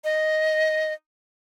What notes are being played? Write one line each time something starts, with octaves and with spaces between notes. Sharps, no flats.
D#5